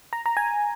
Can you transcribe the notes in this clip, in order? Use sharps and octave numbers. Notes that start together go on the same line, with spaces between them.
A#5
A#5
G#5